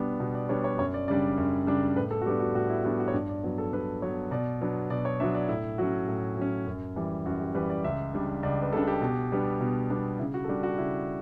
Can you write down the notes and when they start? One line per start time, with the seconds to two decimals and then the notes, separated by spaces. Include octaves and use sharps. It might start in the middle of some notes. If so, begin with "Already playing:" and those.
Already playing: B2 G3 B3 D4
0.20 B2
0.35 D5
0.49 G3 B3 D4 C#5
0.64 C#5
0.78 F#2 C#5
0.94 D5
1.08 C#3 G3 D4 D5
1.37 F#2
1.67 C#3 G3 D4
1.96 A2 B4
2.11 A4
2.22 F#4
2.26 G3 B3 D4 G4
2.40 F#4
2.55 A2 F#4
2.70 E4
2.84 G3 B3 D4 F#4
3.00 F#4
3.08 C#5
3.14 G2 D5
3.29 D5
3.44 F#3 B3
3.58 A4
3.73 G2 B4
4.02 F#3 B3 C#5
4.31 B2 D5
4.61 F#3 B3 D4
4.90 B2 D5
5.05 C#5
5.20 F#3 B3 D4 E5
5.35 D5
5.49 A2 E4
5.78 F#3 C#4 F#4
6.08 A2
6.37 F#3 C#4
6.67 F#2
6.96 E3 G3
7.26 F#2 F#4
7.41 G4
7.55 E3 G3 B4
7.70 D5
7.84 C#2 E5
8.14 C#3 G3 D4
8.43 C#2 D5
8.62 B4
8.72 C#3 G3 D4 A4
8.88 G4
9.02 B2
9.32 G3 B3 D4
9.61 B2
9.90 G3 B3 D4
10.19 C#3 E4
10.34 F#4
10.44 A4
10.49 G3 D4 G4
10.63 F#4
10.78 C#3 E4